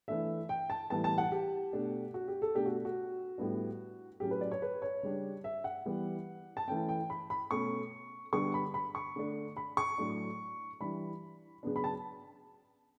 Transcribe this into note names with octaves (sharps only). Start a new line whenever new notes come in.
E3 A3 D4 E5
G5
A5
A2 E3 G3 B3 A5
A5
F#5
G4
B2 A3 D4
F#4
G4
A4
B2 A3 D4 G4
F#4
F#4
A2 G3 B3 D4
A2 F#3 C#4 G4
B4
D5
C#5
B4
C#5
C#3 G3 D4
E5
F#5
E3 G3 B3
A5
E3 A3 C#4 G5
G5
B5
B5
B2 A3 C#4 C#6
D3 G3 B3 D4 C#6
B5
B5
C#6
D3 A3 D4
B5
C#6
A2 F#3 A3 D4
E3 G3 D4 B5
C#3 F#3 B3 D4
B5
A5